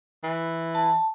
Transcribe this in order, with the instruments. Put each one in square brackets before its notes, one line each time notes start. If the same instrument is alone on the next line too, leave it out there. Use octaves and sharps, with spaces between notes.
[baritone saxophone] E3
[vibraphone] A5